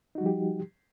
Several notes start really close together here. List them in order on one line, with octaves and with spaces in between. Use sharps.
D#4 F#4 G3 F3 G4